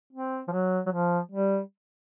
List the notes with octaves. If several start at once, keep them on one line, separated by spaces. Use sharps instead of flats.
C4
F3
F#3
F#3
F3
G3